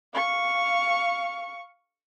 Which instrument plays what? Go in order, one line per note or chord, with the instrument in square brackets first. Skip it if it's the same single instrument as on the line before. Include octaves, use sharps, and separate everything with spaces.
[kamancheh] F5 C#6